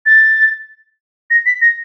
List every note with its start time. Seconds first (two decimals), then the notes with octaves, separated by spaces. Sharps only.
0.06 A6
1.30 A#6
1.46 B6
1.62 A#6